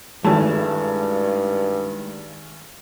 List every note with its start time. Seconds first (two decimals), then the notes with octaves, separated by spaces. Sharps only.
0.25 G#1 G2 G#3 A3 E4 A5